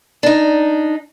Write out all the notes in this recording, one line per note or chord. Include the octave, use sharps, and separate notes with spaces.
D4 D#4